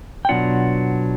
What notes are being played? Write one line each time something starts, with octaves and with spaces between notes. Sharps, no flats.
G5
B2 F#3 B3 D4 F4 F#5